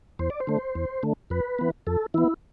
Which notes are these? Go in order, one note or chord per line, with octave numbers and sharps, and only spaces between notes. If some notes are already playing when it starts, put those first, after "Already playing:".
E2 C5
D5
C5
D3 A3
E2
D3 A3
F2 B4
E3 B3
F2 A4
E3 B3 E4